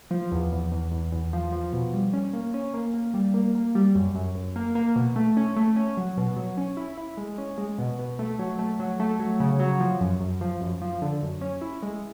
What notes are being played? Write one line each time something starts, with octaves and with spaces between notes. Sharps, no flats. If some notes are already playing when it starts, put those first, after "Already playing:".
F3
E2
E2
E2
E2
E2
F3
F3
B2
G3
C#4
A#3
C#4
A#3
A#3
G3
A#3
A#3
G3
F#2
F#2
F#2
A#3
A#3
B2
A3
C#4
A3
C#4
F#3
B2
F#3
C#4
E4
E4
G#3
C#4
G#3
B2
B2
A3
F#3
A3
F#3
A3
F#3
C#3
F#3
F3
F#2
F#2
F3
F#2
F3
D3
F#2
C#4
E4
G#3